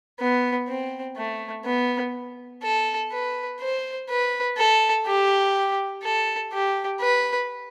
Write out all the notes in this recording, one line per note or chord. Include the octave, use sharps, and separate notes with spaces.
B3
C4
A3
B3
A4
B4
C5
B4
A4
G4
A4
G4
B4